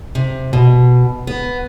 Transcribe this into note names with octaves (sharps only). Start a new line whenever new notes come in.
C3
B2
B3